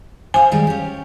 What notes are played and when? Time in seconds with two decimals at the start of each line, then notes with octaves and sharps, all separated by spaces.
0.34 C5 F5 G#5
0.52 D#3 G3 G#3
0.67 C#4 G4